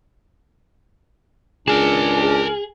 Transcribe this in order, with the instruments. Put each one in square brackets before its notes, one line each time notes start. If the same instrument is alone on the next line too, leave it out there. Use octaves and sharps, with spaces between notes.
[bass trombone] C#2 [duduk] D4 [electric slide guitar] G#4 [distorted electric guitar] A#4 A5